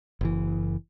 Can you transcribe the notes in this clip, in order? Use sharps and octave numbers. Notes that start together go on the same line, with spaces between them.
F#1 E3